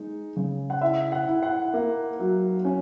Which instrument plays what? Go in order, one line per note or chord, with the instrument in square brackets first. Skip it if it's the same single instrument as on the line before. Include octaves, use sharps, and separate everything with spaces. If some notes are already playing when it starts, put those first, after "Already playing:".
Already playing: [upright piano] G#3 D#4
C#3
[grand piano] F#5
[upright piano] E4 [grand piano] E5
[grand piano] F#5
[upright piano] E4
[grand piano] F#5
[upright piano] A#3
F#3
C#4